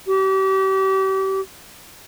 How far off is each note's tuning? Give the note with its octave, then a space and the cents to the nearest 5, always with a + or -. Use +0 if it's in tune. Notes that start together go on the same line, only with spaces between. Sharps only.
G4 -35